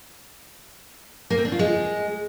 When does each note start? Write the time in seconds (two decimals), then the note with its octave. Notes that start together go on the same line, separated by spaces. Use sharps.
1.30 A#3
1.38 C4
1.45 D4
1.52 F4
1.59 G#3